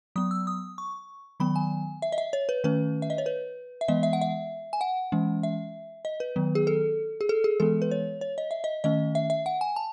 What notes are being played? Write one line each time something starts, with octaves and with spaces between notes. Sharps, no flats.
F#3 B3 D#6
E6
D#6
C#6
D#3 F#3 B3 B5
G#5
E5
D#5
E5
C#5
B4
D#3 A3 C#4 B4
E5
D#5
C#5
B4
E5
E3 G#3 B3 D#5
E5
F#5
E5
G#5
F#5
E3 G#3 C#4
E5
D#5
B4
D#3 F#3 B3
G#4
A4
G#4
A4
G#4
E3 G#3 B3 A4
B4
C#5
C#5
D#5
E5
D#5
D#3 A3 C#4 D#5
E5
E5
F#5
G#5
A5